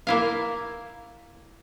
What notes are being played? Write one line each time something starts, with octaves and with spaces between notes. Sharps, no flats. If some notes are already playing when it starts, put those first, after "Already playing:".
A#3 E4 F5